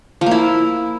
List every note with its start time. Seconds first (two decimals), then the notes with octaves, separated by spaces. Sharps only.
0.21 F3
0.26 A#3
0.31 E4